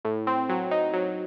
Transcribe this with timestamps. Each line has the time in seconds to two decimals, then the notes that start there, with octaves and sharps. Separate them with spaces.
0.05 A2
0.27 C4
0.49 F#3
0.71 D#4
0.94 F#3